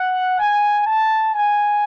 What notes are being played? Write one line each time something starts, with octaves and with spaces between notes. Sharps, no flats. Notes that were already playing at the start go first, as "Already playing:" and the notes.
Already playing: F#5
G#5
A5
G#5